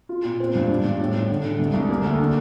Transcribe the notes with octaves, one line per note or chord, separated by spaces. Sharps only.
F4
A#2
C4
G2
D4
G2
A2
A2
D3
D3
C2
C2
A#3
D2
D4